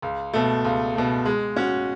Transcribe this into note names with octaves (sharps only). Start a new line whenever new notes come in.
C#2
B2 A3
C#2
B2 A3
G#3
C#4 F#4